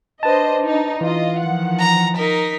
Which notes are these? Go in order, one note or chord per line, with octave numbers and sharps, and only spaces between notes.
D4 B4 C5 D#5 A5
D#4
E3 F4 D#5
D#3 F3 F#5
A#5
D#4 A#4 B6